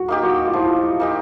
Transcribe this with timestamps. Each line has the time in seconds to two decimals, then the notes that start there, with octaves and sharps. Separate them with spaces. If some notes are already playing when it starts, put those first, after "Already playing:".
Already playing: F#4
0.08 A#3 D#4 G4
0.23 F#4
0.47 F4
0.53 F3 E4
1.00 A#3 D#4 G4